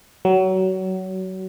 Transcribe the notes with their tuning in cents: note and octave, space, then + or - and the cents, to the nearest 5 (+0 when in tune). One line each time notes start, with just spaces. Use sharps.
F#3 +25